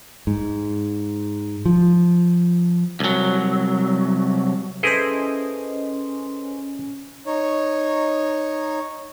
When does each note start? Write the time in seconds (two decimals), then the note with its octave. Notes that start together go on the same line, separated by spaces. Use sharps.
0.27 G#2
1.65 F3
3.00 C2 F#3
4.83 C#4 E4 G#4 A4 B4 C5 D#5 C6
7.26 D#4 C#5